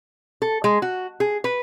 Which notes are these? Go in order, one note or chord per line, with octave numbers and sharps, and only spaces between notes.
A4
G#3
F#4
G#4
B4